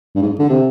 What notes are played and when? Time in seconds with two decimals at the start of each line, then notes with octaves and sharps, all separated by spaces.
0.15 G2
0.22 G#2
0.39 D3
0.49 C3